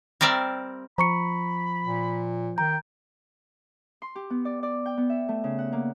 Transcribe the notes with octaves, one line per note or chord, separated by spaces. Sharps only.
G3 C4 A#4 D5 E5
F3 A#5 B5 C#6 C#7
A#2
D#3 G5 A#5
C6
G4
B3
D5
D5
G5
B3
E5
A3
C#3
F#5
A#3